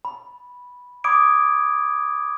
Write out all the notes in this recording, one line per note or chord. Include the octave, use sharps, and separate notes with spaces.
B5
B5 D6 D#6 G#6 D7